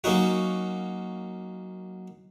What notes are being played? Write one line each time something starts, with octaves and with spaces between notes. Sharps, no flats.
F#3 A#3 C#4 D#4 F#4